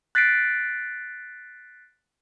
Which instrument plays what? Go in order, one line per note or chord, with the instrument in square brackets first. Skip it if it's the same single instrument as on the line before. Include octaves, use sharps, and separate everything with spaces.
[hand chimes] F#6 A6 B6 C7 D7